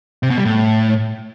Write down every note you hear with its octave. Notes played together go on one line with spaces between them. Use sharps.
C3
B2
G3
A2